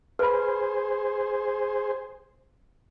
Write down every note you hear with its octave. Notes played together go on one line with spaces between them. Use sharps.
G#4 B4 C5 B5